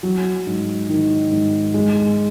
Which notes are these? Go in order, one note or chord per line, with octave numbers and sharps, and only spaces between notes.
F#3
G#2
D#3
G#2
G#3